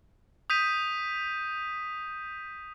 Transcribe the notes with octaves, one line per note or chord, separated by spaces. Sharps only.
D#6 G6 B6 D#7